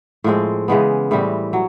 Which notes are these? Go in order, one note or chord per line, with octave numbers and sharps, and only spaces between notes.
A2 F3 G#3 C4
C#3 E3 G#3 B3
A2 E3 G3 C4
F#3